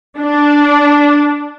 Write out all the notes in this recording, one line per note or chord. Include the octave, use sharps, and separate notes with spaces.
D4